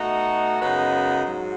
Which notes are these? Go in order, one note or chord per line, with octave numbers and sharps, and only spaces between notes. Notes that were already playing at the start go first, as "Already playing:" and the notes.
Already playing: B2 A3 D#4 F#4
F#2 C#3 G#3 B3 D#4
G#2 F#3